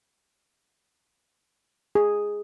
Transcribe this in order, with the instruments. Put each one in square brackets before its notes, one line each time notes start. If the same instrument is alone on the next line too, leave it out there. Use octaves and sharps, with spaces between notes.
[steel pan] G#4